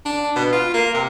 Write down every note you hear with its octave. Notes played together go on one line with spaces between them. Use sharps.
D4
B2
F4
A#3
C3